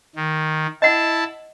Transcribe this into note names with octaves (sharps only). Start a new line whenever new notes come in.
D#3
E4 D#5 F#5 A5